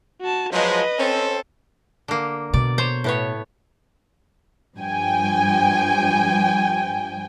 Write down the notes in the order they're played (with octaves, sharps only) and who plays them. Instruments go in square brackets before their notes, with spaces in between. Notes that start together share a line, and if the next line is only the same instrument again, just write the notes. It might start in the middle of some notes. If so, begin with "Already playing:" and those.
[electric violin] F#4 A5
[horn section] F3 F#3 G#3 [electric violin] B4 D#5
[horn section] C4 C#4 A4
[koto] D3 A#3
[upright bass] B2 [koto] D5
[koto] C5 C#5
A2 B3 C#5
[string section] G2 F3 G5 G#5